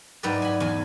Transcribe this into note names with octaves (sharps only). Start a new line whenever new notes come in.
G#2 F#3 E4 B4 D5 G5
G#5 B5
E2 G#5